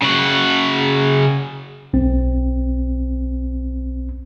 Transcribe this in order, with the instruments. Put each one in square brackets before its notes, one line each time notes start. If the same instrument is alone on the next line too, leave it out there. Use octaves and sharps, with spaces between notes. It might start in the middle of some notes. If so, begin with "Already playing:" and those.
[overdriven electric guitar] C#3 F#4
[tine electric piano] B1 C4